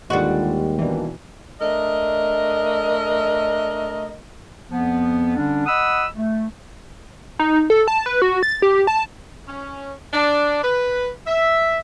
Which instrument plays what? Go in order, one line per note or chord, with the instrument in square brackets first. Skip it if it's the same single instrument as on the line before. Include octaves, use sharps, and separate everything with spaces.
[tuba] D#2 [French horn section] D3 D#3 F4 [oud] G3 F#4 [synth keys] G#3
[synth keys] B2 E3 [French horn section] D#3 A#3 D4
[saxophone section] A3 D4 A#4 D#5
[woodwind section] F2 F3 B3
D3 G3 C#4 D4
D#5 F#5 B5 D#6 E6
A3
[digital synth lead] D#4
A4
A5
B4
F#4
A6
G4
A5
[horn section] C#4
D4
B4
E5